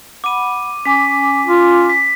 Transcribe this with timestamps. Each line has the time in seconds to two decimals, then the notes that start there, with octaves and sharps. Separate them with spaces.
0.24 F#5 B5 D6 D#7
0.85 C#4 G#5 D6 B6
1.47 F4
1.89 B6